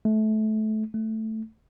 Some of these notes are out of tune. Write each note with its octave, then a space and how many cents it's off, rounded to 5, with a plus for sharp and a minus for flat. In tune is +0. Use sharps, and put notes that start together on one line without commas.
A3 -25
A3 +0